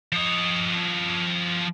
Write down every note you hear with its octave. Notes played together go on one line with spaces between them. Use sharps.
F3 D#5